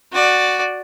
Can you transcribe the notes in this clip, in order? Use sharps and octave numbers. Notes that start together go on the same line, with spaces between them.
F#4 D5